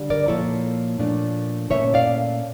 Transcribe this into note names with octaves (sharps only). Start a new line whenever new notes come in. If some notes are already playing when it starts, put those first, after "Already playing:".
Already playing: D3 G3 D4
A#4 D5
A#2 F3 A#3 E4 A4 C#5
A#2 F3 A3 D4 F4
A#2 A3 C#4 E4 C#5 E5
D5 F5